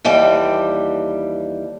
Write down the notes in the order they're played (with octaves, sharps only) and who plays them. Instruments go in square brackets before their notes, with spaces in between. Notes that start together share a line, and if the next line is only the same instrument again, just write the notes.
[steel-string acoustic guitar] D#2 E3 G3 A4 G5